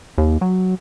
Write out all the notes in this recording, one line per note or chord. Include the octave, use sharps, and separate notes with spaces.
D#2
F#3